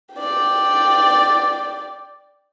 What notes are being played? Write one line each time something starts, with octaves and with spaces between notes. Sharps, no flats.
D5 G5